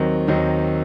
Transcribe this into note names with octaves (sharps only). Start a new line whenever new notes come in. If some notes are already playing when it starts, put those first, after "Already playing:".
Already playing: D#2 D#3 F#3 C4 D#4
D#2 D#3 F#3 C4 D#4